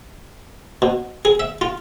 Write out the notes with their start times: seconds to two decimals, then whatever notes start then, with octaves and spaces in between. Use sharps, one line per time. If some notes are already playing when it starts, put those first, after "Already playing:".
0.82 B2
1.25 G#4
1.40 E5
1.61 F4